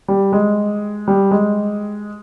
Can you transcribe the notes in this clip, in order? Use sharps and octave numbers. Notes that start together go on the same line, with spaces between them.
G3
G#3
G3
G#3